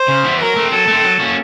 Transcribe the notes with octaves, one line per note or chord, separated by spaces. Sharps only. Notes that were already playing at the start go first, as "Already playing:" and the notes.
Already playing: C5
C#3
E3 G3 B3 E4
F#3 A#4
A3 C4
F#3 A4
A3 C4
F#3
A#3 C#4 F#4